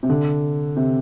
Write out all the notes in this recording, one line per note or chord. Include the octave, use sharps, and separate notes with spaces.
C3
D3
C3